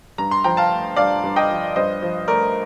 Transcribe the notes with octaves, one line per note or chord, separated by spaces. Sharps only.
G2 A#5
C6
F3 G5 A#5
F5 A5
A3
G2 D5 F5
G2
D#5 G5
F3
G2 C5 D#5
F3
A3 A#4 D5